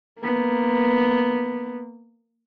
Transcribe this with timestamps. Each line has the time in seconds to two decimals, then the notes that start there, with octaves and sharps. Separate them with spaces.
0.20 A#3 B3